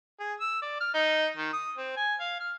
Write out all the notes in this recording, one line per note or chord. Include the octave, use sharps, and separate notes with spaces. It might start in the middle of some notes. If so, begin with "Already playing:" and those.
G#4
E6
D5
F6
D#4
D#3
D#6
C4
G#5
F5
F6